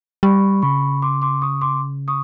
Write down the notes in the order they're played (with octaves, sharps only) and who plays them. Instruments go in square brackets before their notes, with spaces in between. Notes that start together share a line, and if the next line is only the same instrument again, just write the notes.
[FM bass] G3 [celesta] B5 C#6
[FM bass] C#3 [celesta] B5 C#6
[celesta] C6 D6
C6 D6
C#6 D#6
C6 D6
C#6 D#6